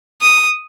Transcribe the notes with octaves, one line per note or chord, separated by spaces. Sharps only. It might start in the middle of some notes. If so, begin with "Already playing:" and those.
D#6